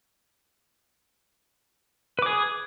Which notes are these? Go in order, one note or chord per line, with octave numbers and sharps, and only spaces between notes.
G#4 B4 D6